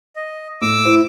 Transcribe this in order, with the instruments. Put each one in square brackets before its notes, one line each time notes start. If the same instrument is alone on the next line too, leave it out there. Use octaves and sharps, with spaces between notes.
[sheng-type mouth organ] D#5
[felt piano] A2 [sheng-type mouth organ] D6 E6
[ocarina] E4 [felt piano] C5